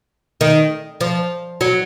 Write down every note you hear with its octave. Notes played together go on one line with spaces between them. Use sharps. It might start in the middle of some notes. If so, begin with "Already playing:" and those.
D#3
F3
F#3